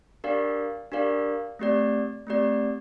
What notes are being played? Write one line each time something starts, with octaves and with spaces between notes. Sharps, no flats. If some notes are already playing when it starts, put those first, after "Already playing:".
D4 G4 A#4 D5 F5
D4 G4 A#4 D5 F5
A3 C4 G4 D5
A3 C4 G4 D5